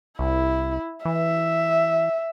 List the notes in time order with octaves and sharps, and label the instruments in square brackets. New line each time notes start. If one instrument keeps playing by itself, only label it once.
[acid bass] C2 [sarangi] E4
[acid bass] E3 [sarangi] E5